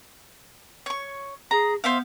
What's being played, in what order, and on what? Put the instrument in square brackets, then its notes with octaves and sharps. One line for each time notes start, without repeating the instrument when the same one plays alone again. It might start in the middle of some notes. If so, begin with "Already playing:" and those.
[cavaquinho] C#5 C#6
[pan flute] G#4 [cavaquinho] A#5
[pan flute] B3 [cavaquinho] C5 E5 F5